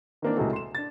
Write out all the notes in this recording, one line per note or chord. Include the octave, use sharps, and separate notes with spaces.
D#3 E3 A#3 C4 D4
C#2 A2 C3 G#3 F#4 A4
C6 E7
D4 A6